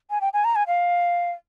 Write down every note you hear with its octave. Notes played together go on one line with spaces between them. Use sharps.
G#5
G5
G#5
A#5
G#5
F5